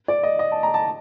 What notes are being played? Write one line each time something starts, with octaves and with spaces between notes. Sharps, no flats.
D5
D#5
D#5
A5
A#5
A5